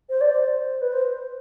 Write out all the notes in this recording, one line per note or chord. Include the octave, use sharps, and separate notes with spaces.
C5
D5
C5
B4
C5